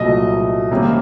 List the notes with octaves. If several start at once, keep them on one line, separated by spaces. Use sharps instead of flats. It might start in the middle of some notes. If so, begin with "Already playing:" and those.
Already playing: C2 A#2 F#3 A3 D#5
C3 D#3 G3 A#3 C#4